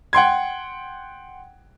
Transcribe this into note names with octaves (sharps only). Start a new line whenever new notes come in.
F#5 G5 C6 G#6